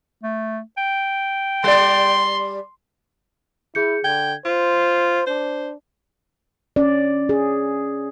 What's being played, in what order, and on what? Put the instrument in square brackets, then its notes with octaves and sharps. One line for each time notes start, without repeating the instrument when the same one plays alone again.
[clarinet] A3
G5
[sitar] G3 D5 [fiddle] C6
[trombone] E4 [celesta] G#4 G6 C#7
[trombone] D3 [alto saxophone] G5 [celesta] G#6
[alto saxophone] F4 [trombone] C5 [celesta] C6
[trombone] D4 [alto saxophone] C5
[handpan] C#4 D5
G#4